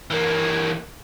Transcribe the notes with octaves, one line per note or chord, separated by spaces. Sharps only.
E3 A#3